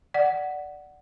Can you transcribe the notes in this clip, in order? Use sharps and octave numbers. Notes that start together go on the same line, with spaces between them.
D5 F#5